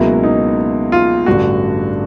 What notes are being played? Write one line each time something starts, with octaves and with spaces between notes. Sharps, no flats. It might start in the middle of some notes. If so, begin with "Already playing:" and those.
Already playing: C#2 B2 F#3 A#3 E4
D#4
F4
A1 G2 D3 F#4